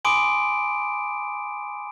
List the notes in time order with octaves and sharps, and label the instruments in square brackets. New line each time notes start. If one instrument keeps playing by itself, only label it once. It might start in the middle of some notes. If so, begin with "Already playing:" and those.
[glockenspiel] G#5 B5 C6 D6 D#6 D7